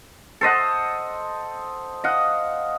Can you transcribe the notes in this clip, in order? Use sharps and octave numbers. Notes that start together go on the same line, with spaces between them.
A4 C5 D#5 F#5
D#5 F5 F#5